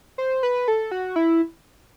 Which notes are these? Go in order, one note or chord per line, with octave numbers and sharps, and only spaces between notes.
C5
B4
A4
F#4
E4